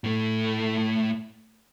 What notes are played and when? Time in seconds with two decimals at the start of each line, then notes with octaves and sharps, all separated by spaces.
0.04 A2 A3